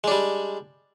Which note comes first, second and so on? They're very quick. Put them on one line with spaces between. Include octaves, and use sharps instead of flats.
G#3 D4 G3